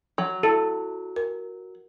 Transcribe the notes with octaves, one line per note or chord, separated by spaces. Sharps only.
F#3
E4 A4
A#4